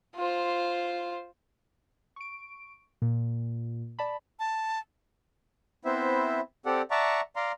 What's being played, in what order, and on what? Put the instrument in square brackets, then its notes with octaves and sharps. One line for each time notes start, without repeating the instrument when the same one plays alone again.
[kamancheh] F4 C5
[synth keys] C#6 D7
A#2
D5 A5 B5
[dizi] A5
[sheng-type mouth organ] B3 C4 E4 C5 E5
C4 G4 A4 D5 F#5
D5 E5 F#5 A5 A#5 C#6
D5 F5 A#5 C6